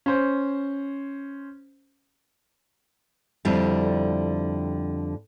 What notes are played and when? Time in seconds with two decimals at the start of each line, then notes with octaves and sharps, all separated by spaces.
0.06 C#4 C5
3.45 F2 D3 G3 E4